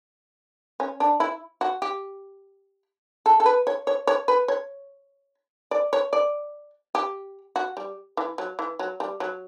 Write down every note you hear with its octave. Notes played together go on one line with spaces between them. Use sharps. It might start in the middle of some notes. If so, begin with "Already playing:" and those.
C#4
D4
E4
F#4
G4
A4
A4
B4
C#5
C#5
C#5
B4
C#5
D5
C#5
D5
G4
F#4
G3
E3
F#3
E3
F#3
G3
F#3